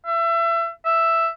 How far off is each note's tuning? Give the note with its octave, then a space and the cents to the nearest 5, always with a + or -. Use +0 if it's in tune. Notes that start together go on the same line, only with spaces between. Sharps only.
E5 +30
E5 +5